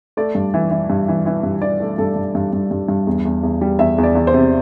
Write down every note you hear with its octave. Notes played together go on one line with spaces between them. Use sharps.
A3 D5
G2
E3
E3
G2
E3
E3
G2
E3 D5
A3 A4
G2 A4
G2
G2
G2
G2
G2
E2
E2
E2
G3
E2 E5
E2
D5
E2
C5
C3